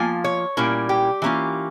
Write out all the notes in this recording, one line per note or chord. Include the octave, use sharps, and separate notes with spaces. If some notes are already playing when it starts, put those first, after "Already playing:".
Already playing: F3 A#3 F4 G#5
C#5
A#2 G3 C#4 E4 A#4
G4
E3 A#3 C#4 F4